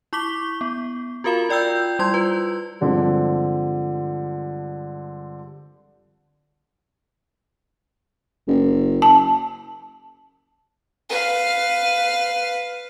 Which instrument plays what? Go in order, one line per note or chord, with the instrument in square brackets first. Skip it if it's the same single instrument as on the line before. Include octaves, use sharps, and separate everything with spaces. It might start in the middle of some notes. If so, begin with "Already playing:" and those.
[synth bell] E4 C#6 D6 B6 G7
B3
F4 F#4 A#4 F5 B5
F4 D5 G5 E6 G6
G3 E4 C6 G#6
F4 B4
[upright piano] G2 D3 F3 G#3 C4
[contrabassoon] F#1
[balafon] A5
[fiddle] B4 F5